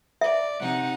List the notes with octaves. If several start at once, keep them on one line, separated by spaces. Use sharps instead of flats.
D5 E5
C3 D#4 F#5